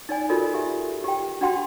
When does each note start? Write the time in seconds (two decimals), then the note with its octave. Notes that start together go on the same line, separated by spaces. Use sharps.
0.09 D#4 D5 G#5
0.29 F4 F#4 A4 A#4 D5 D#5
0.54 G4 E5
1.04 G4 G5
1.41 D4 F#4 F#5 G5 C6